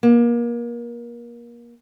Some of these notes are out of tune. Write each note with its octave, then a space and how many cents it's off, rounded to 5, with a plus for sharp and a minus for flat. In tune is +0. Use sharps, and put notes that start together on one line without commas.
A#3 +30